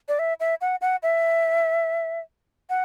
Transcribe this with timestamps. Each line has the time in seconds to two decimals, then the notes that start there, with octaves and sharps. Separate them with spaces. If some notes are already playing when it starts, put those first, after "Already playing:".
0.08 D5
0.19 E5
0.40 E5
0.61 F#5
0.81 F#5
1.03 E5
2.70 F#5